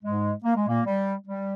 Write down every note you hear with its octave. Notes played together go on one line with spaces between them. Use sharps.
G#2 G#3
A#3
G#3
A#2 A#3
G3
G3